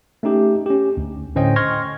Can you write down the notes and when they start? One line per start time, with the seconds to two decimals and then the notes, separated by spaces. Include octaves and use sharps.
0.23 A3 C#4 D#4 G4
0.66 C#4 G4
0.97 D2
1.35 A2 D3 C#4 C5 D#5 G5
1.56 C6 C#6 F6 G#6 A#6